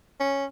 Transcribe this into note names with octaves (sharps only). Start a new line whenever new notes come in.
C#4